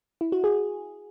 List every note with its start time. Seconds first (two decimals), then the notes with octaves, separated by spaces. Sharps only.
0.21 E4
0.32 F#4
0.44 G#4